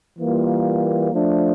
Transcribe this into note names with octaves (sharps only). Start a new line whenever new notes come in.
E3 G3 A#3 F4
F3 A3 D4